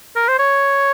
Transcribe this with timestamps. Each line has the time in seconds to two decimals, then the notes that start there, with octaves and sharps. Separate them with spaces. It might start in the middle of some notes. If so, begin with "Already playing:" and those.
0.16 A#4
0.28 C5
0.39 C#5